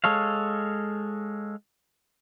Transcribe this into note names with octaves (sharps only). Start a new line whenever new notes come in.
G#3 A4 C#5 F5